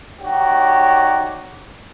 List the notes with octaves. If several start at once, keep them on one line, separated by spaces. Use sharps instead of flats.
D#4 F#4 G4 C#5 D5